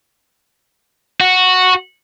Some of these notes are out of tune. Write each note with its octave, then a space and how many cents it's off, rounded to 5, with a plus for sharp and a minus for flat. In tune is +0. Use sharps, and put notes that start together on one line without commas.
F#4 -5